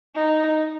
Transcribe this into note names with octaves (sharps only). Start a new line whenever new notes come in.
D#4